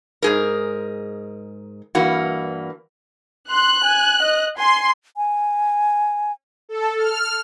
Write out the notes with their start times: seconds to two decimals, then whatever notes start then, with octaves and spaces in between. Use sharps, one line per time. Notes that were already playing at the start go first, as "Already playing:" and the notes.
0.22 G#2 G#4 A#4
1.95 G2 E3 A#3 F#4
3.50 C6 F#6
3.84 G#5
4.23 D#5
4.59 G#5 C6
5.17 G#5
6.69 A4
6.97 F6